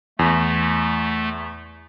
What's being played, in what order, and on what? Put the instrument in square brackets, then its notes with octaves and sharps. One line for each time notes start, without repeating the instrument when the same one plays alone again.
[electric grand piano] E2 [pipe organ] A3